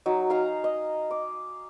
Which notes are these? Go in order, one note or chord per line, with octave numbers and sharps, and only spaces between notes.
F#3 D#4
D#4 F5 G#5 A#5
D#5
D6